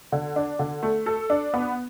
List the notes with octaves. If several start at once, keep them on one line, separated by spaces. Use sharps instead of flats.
D3
D4
D3
A3
A4
D4
B3